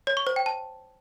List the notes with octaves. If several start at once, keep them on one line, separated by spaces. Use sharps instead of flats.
C#5
C#6
C5
G5
A5